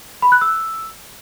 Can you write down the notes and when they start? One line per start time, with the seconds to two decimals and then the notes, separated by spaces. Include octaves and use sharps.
0.22 B5
0.32 F#6
0.41 E6